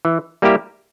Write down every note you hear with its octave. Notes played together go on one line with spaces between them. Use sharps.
E3
G3 A#3 E4 G4